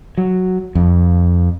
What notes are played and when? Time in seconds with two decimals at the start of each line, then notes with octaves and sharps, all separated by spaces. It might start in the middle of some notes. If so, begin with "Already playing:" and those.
0.18 F#3
0.75 F2